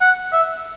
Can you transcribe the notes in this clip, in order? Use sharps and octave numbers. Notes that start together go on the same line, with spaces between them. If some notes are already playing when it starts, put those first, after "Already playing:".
F#5
E5